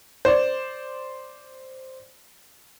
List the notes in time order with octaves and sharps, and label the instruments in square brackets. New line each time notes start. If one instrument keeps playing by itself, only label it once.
[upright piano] C5 D5